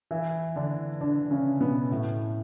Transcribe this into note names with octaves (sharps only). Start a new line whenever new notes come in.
E3 E4
D3 D4
D3 D4
C#3 C#4
B2 B3
A2 A3